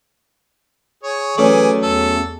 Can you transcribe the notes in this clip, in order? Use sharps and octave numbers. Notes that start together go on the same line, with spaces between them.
G#4 C#5
E3 F#3 A3 C#4 G#4 D5
E2 A4